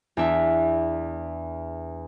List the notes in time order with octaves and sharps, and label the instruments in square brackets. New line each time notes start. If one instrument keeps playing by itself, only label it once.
[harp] E2 D4 E5